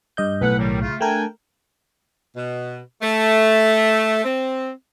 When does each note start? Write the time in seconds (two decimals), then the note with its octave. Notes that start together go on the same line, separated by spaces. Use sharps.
0.17 G2 D#5 G6
0.41 B1 A2 B4 F#5
0.58 D#3 F#3 G3
0.81 C#3 A3 F4
1.01 A3 D4 A#4 G5 G#5
2.36 B2
3.02 A3
4.25 C4